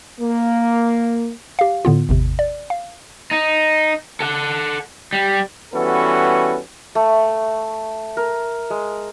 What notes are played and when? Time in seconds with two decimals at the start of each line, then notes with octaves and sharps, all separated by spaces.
0.21 A#3
1.59 G4 F5
1.85 A2 D3 B3 F4
2.09 G#1 E2 C3
2.39 D5
2.70 F5
3.31 D#4
4.20 A4 F#5
5.13 G3
5.74 E3 G3 B3 C#4 F#4 A4
6.95 A3
8.17 A#4
8.70 G#3